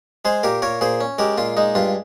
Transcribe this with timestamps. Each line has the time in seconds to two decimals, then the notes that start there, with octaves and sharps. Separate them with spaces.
0.25 G#3 G#4 C5
0.43 A#2 G4 A#4
0.62 A#2 A#4 C#5
0.81 A#2 G#4 C5
1.01 C#4
1.18 G#3 G4 A#4
1.38 A#2 F4
1.57 G#3 D#4
1.75 G2 F4